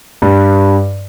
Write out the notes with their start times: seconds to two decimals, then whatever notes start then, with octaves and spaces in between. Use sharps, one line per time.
0.22 G2